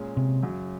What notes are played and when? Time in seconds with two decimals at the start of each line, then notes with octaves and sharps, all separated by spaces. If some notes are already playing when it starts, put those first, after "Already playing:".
Already playing: A#2 G#3 C#4
0.17 C3
0.43 F#2 C#3 F#3